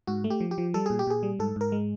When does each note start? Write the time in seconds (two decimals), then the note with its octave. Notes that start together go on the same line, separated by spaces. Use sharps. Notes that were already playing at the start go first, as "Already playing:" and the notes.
0.07 G#2 F#4
0.24 A3
0.30 G4
0.40 F3
0.51 G4
0.58 F3
0.74 G3 A4
0.86 A#2 G#4
0.99 G4
1.07 A#2 G#4
1.23 G3
1.39 G#2 A4
1.56 G#2 A#4
1.72 G#3